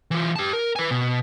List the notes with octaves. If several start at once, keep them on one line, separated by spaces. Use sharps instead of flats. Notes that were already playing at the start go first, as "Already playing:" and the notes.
E3 F4
G4 A5
A#4
B4 G#5
B2